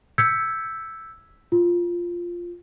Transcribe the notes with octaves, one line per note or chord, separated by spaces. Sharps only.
E6 G6 G#6 B6 C#7
F4